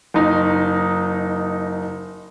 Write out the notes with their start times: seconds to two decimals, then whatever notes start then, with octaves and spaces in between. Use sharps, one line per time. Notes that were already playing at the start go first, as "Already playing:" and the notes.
0.14 F#1 D#4